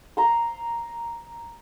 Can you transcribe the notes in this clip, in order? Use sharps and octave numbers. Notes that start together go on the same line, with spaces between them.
A#5 C6